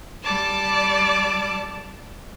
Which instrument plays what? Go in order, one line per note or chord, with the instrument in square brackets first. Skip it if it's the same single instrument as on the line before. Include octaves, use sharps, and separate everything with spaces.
[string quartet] G3 D5 A5 D6